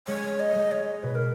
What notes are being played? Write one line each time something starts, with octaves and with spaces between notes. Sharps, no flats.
G#3 C#5
D#5
G#3
C#5
B2 B4
A#4